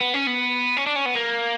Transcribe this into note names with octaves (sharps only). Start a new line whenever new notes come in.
B3
C#4
B3
C#4
D4
C#4
B3
A#3